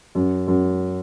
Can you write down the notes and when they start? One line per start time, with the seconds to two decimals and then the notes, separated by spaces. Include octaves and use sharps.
0.15 F#2
0.47 F#2